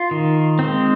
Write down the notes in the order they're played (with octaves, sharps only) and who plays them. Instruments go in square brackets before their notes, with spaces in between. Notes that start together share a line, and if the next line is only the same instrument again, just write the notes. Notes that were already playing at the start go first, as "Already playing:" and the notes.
Already playing: [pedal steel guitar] F4
D#3
G#3 C4